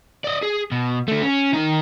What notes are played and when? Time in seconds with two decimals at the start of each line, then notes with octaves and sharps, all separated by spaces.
0.24 D5 D#5
0.42 G#4
0.72 B2
1.08 D3 A3
1.22 C#4
1.53 D#3 D#4